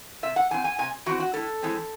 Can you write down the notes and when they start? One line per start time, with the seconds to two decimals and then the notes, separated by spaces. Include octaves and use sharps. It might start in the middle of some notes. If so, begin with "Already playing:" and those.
0.23 C3 E5
0.36 F#5
0.51 E3 C4 G#5
0.64 G#5
0.78 C3 G#5
1.06 E3 C4 F#4
1.20 F#4
1.34 A2 A4
1.63 E3 G#3 C4